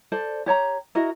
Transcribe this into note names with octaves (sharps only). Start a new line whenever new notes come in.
A4 C5 D5
G4 C#5 A5 A#5
E4 F#4 A#4 D#5